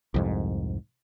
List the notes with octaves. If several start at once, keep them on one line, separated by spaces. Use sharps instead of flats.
C2 F2 G#2